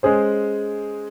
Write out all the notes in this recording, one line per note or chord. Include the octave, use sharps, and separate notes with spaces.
G#3 C#4 G#4 C5